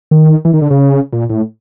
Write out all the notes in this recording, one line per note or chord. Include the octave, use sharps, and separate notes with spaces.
D#3
E3
D#3
D3
C#3
A#2
A2